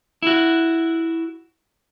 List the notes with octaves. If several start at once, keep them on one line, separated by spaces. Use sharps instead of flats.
E4 F#4